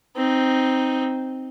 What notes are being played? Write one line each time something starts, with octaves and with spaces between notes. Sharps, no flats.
C4 D#4